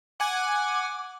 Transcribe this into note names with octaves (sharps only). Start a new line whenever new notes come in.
F#5 G#5 D6